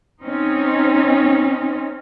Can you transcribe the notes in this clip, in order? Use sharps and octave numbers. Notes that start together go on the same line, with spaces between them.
C4 C#4 D#4